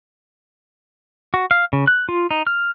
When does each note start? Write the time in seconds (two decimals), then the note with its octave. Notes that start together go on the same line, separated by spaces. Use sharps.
1.34 F#4
1.51 F5
1.73 C#3
1.87 F#6
2.09 F4
2.31 D#4
2.47 F6